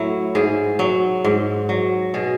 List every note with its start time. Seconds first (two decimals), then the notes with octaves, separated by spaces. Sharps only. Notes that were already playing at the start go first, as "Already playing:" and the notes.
Already playing: A2 F#3 E4
0.35 G#2 G#4
0.79 F#3
1.24 G#2
1.69 F#3
2.14 B2 G#4